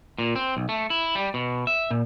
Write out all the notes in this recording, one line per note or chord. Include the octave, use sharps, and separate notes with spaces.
A#2
C4
B1
A3
E4
G3
B2
E5
A#2